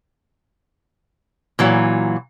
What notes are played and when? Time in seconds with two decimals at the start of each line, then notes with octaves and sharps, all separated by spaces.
1.59 A#2 E3 F#3